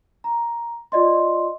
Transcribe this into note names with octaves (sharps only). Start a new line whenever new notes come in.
A#5
F4 D5 D#5 C6